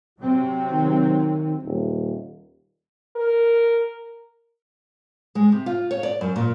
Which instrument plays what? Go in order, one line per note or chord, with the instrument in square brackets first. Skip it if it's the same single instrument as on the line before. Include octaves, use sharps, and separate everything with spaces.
[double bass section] C3 F#3 C4
[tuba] D#3
D#1
[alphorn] A#4
[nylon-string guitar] G#3
C3
F4
C#5
D5
F#2
A#2